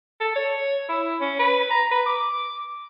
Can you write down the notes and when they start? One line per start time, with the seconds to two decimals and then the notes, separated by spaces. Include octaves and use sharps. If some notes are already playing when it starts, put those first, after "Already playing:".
0.21 A4
0.36 C#5
0.89 E4
1.21 C#4
1.39 B4
1.70 A#5
1.91 B4
2.06 D6